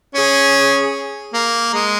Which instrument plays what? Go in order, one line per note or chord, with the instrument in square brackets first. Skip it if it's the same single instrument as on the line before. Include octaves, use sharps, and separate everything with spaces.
[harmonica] C#4 [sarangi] G#4
[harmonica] A#3
G#3